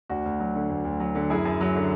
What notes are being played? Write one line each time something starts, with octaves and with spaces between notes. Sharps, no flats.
D2 D4 F#4
D2
F#3
D3
D2
D2
F#3
D3
F#2 E4 G#4
F#2
F#3
D3